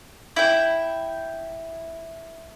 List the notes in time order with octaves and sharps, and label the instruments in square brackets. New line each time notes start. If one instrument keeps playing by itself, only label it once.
[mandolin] E4 G5